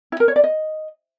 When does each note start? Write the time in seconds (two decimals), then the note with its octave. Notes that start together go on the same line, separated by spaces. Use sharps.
0.12 E4
0.20 A#4
0.28 C#5
0.36 D5
0.44 D#5